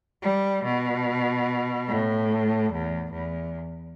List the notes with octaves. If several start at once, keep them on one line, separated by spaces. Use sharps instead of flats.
G3
B2
A2
E2
E2